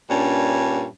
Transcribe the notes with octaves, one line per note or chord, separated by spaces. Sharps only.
G2 A#2 C#4 D4